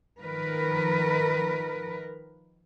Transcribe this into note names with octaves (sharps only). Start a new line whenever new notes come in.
D#3 F3 A#4 B4